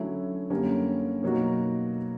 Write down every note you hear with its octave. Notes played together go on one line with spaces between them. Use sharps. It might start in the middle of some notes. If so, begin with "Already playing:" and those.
Already playing: D3 F#3 A3 C#4 E4
F#2 D3 G3 A#3 C#4
B2 F#3 A#3 D#4 F#4